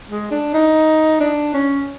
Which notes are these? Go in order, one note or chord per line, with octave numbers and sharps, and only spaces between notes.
G#3
D4
D#4
D4
C#4